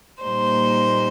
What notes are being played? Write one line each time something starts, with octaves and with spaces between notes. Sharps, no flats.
A#2 G3 A#3 D#4 C5